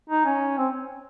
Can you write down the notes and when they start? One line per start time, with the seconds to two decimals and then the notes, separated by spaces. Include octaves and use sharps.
0.10 D#4
0.25 C#4
0.58 C4